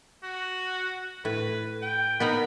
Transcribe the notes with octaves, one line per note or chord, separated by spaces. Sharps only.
F#4
A2 B4
G5
B3 D#4 A#4 B5